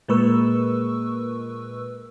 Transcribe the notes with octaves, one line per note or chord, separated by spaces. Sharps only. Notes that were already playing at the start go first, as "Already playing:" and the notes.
A#2 G#3 A#4 B4 C#6 E6